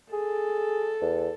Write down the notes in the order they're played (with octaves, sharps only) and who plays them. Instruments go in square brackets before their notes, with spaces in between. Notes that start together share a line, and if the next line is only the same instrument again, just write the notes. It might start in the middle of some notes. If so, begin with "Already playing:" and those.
[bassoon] G#4 [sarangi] A4
[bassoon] E2